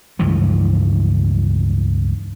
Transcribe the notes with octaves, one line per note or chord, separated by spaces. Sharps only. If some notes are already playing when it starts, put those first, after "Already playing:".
C#2 G2 E3 F3